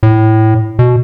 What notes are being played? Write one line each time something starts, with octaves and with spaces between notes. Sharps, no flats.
A2
B2